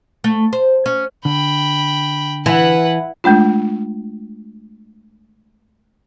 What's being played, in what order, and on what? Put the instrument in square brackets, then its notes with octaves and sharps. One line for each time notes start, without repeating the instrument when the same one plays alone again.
[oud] A3
C5
C#4
[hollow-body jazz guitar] D3 [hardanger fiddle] G5 B5
[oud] E3 [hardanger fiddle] B4 F#5
[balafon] G#3 A3 D4 F4